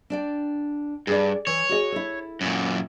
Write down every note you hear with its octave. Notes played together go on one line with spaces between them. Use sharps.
D4 D5 G5
G2 G#4 D5
E3 C#5
F#4 G#4 D#5
E4 A4
F#2 A#2